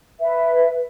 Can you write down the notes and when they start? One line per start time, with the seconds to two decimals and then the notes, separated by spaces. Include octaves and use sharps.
0.21 B4 E5